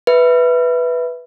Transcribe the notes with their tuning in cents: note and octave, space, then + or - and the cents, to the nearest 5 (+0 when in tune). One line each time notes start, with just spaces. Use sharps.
B4 +0 E5 -5